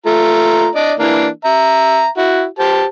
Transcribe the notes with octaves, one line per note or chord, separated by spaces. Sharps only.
A3 F4 A#5
D4 D5 D#5
E3 A#3 D4
E5 A#5
E4 F#4
G4 C5 A5